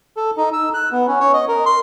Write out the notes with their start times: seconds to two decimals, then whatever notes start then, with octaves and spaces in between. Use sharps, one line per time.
0.17 A4
0.37 D#4
0.53 E6
0.74 F#6
0.92 B3
1.07 C#4
1.20 C#5
1.33 D#5
1.48 A#4
1.66 C6